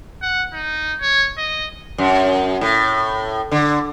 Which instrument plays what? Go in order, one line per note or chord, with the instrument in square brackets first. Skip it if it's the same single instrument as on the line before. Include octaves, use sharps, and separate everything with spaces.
[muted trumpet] F#5
D#4
C#5
D#5
[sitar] F#2
A2
D3